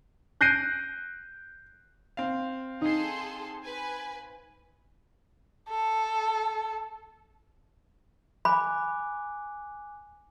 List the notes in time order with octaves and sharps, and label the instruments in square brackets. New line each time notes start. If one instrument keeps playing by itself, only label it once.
[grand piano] F#6 G6 A#6 C7 D7 D#7
[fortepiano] C4 F5
[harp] D#4 C7 [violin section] G#4 A4 C6
[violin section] B4 G#5
[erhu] A4
[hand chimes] G#5 D6 F#6 [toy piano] B5